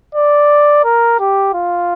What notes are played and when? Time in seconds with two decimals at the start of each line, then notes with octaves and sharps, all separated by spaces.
0.15 D5
0.84 A#4
1.19 G4
1.54 F4